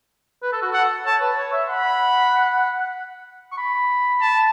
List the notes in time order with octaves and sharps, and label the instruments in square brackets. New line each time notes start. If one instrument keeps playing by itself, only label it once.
[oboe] B4
A4
F#4
[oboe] A4 [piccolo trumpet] F#5
[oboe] C#5 [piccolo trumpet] A5
[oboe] B4
C#5
E5
[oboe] F#5 [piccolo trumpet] B5
[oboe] C#6
B5
[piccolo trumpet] A5